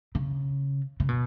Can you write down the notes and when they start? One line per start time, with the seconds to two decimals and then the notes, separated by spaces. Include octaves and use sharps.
0.15 C#3
1.00 C#3
1.09 B2